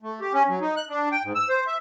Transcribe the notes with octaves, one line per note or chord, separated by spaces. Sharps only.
A3
G4
C#4
F#3
D#4
F#6
D4
G5
G#2
E6
C5
E5